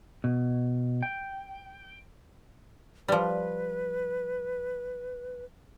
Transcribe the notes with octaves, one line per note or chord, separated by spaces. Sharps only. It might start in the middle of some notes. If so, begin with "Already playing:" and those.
B2
G5
F3 G3 B4